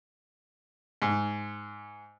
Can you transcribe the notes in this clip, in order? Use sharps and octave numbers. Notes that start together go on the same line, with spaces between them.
G#2